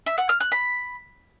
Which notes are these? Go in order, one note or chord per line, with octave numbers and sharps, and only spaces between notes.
E5
F#5
F6
F#6
B5